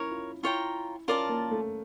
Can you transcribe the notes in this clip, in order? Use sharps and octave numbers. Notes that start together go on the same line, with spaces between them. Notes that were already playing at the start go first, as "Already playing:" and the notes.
Already playing: C#4 E4 A#4 C#5
F4
E4 F4 C#5 G5 A#5
C#4 F4 A#4 D5 A5
A#3
A3